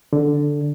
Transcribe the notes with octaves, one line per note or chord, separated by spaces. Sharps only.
D3